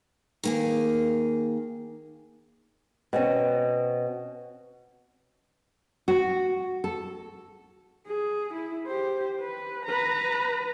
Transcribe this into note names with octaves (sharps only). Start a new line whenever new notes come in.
D#3 A#3 G#4
B2 C4 C#4
F#4
A4
G#4
E4
G4 C5
B4
B4 A#5